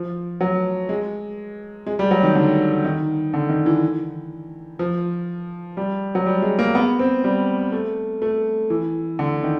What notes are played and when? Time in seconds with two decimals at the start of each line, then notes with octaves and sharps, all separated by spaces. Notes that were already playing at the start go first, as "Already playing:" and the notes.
Already playing: F3
0.41 F#3
0.89 G#3
1.87 G#3
1.99 G3
2.11 F#3
2.23 D#3
2.35 D3
2.84 D#3
3.34 D3
3.49 D#3
3.66 E3
4.79 F3
5.77 G3
6.15 F#3
6.26 G3
6.42 G#3
6.59 A#3
6.75 B3
6.99 C4
7.24 G3
7.72 A3
8.22 A3
8.70 E3
9.19 D3
9.43 D#3